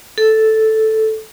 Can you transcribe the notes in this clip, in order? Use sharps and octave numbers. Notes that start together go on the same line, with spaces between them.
A4